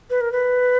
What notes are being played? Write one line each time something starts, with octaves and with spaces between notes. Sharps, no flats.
B4
A#4
B4